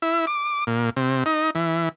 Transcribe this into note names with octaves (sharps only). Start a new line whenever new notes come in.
E4
D6
A#2
C3
D#4
E3